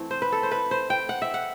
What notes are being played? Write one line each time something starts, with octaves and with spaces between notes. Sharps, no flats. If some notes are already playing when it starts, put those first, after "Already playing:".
Already playing: E3 A3 C4
C5
B4
A4
C5
B4
C5
G5
F#5
E5
F#5